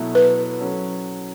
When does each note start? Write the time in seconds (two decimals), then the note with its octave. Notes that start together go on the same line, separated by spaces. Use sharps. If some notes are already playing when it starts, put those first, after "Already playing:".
Already playing: B2 F#3 A3 E4
0.15 B4
0.59 F#3 C#4 A4